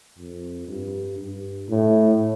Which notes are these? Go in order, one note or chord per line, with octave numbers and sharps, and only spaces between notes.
F2
G2
G2
A2